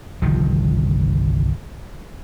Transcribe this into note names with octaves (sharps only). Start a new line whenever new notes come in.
G1 C2 D#3 F3